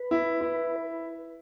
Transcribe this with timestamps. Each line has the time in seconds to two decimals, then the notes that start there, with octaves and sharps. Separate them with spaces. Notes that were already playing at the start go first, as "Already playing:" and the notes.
Already playing: B4
0.11 E4
0.41 E4